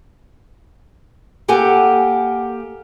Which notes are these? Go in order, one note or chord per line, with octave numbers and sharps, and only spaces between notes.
A#3 G4 A4 F#5 G#5